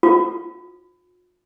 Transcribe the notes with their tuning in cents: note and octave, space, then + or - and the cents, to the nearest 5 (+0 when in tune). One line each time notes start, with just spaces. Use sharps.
F4 +45